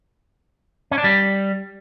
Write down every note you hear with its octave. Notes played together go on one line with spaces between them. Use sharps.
C#4
D4
G3